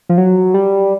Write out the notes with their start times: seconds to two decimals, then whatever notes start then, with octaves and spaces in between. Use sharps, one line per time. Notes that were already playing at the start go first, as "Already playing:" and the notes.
0.09 F3
0.18 F#3
0.54 G3